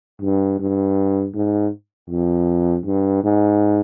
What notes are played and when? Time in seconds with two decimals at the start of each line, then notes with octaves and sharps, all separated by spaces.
0.21 G2
0.59 G2
1.34 G#2
2.10 F2
2.86 G2
3.24 G#2